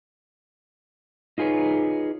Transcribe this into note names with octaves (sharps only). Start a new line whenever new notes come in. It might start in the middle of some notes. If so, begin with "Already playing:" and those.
D#4 F4 G#4 B4 C#5